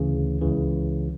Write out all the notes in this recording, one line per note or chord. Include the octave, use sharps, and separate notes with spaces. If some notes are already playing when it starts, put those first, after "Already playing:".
Already playing: D2 C#3 E3
C#2 C#3 E3